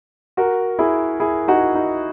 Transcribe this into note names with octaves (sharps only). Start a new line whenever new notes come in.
F#4 A#4
E4 G#4
E4 G#4
D#4 F#4
D#4